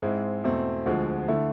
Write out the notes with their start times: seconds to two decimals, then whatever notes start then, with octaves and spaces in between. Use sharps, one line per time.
0.02 G#2 G#3 C4 E4
0.44 E2 B2 A3 C4
0.86 D2 D3 F3 G#3
1.28 D3 A3 E4